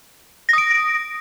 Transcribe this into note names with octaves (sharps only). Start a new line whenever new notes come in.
D#6 A#6 D7